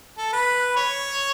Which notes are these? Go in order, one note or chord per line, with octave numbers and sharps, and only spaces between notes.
A4
B4
C#5